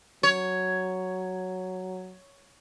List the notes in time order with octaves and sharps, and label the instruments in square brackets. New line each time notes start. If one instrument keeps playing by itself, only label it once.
[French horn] F#3 [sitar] C#5